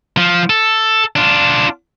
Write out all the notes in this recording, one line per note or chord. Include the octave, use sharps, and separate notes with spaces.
F3
A4
D4 F4